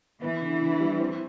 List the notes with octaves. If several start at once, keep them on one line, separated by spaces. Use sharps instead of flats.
E3 B3
D3
D3
G3
C4